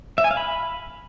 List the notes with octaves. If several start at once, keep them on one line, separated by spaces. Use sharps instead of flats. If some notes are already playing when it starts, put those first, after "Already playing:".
E5
G#5
F5
B5